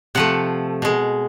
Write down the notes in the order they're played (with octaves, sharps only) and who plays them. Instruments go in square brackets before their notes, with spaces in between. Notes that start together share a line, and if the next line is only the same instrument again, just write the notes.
[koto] C3 F3 A3 F#5
B2 G#3